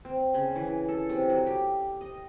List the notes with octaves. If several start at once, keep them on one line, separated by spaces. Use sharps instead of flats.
C4
C#3
E3
A4
C3
F#3
G4
D#5